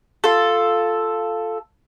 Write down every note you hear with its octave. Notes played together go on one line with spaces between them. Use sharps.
F4 A4